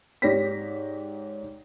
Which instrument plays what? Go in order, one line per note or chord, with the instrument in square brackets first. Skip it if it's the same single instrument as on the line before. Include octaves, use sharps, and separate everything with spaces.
[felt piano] G#2 G4 C#5 D5 A#6 B6